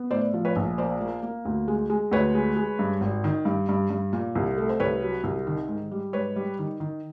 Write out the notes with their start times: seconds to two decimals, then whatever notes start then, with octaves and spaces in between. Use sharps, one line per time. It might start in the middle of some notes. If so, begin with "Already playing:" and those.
Already playing: B3
0.11 A2 C5 D5
0.34 F3
0.45 B4 C#5
0.56 A#1
0.78 A#3 C5 D5
1.01 A#3
1.23 A#3
1.45 D2
1.68 G#3
1.90 G#3
2.11 D2 B4 C#5
2.35 G#3
2.56 G#3
2.79 G2
3.01 G#1
3.24 D#3
3.45 G2
3.69 G2
3.90 G2
4.13 A#2
4.36 C2
4.58 A3
4.69 C5
4.80 C2 B4 C#5
5.02 F#3
5.24 C2
5.47 D#3
5.68 G#2
5.91 G3
6.13 G#2 B4 C#5
6.36 G3
6.59 D#3
6.80 D#3